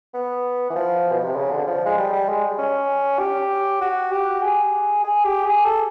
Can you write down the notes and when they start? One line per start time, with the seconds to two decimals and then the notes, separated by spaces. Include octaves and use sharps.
0.14 B3
0.70 E3
0.75 F3
1.12 B2
1.24 C3
1.36 C#3
1.51 D3
1.67 F3
1.86 G#3
1.98 G3
2.12 G3
2.29 G#3
2.58 C#4
3.19 G4
3.81 F#4
4.12 G4
4.42 G#4
5.04 G#4
5.24 G4
5.44 G#4
5.65 A4